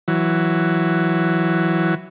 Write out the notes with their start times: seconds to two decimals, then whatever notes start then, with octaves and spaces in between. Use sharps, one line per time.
0.08 E3 F#3